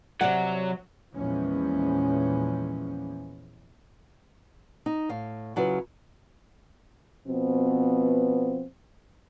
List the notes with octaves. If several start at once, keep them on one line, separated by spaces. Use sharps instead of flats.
C3 F#3 D5 F#5
E2 A#2 E3 F3 G#3 C#4
D#4
A2 F5
C#3 F#3 E4 F4 B4
B2 F3 B3 C4